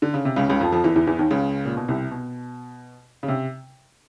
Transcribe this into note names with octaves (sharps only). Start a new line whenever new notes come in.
D3
C#3
C3
C#2 C#3
C#2 C#3
F2 F3
F2 F3
E2 E3
E2 E3
E2 E3
D#2 D#3
C#2 C#3
A#2
B2
C2 C3
B2
C#3
C3